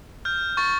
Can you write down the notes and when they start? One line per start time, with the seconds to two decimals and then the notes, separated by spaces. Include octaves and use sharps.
0.25 F6 G6
0.57 C#6 A6